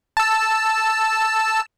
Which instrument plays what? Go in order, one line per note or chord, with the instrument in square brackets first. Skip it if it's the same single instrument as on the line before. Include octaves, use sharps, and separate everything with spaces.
[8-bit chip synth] A5 E6